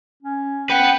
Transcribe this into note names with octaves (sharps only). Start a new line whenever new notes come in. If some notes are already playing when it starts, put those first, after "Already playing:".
C#4
B4 F#5 G5